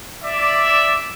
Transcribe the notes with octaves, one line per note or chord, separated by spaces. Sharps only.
D5 E5